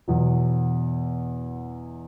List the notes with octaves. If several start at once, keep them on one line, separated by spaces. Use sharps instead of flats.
E2 B2 F#3